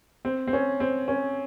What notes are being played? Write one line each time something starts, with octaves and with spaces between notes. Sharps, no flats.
C4
C4
C#4
C4
C#4